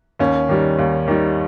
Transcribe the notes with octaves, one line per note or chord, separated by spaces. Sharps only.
D#2 C#4
D#3 G3
D#2
D#3 G3